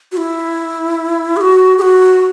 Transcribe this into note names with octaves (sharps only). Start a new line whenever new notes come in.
F#4
E4
G#4
F#4
G#4
F#4